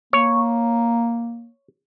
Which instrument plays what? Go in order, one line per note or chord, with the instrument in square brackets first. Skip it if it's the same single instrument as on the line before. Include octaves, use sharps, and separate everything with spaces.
[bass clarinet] A#3 [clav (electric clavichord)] C#5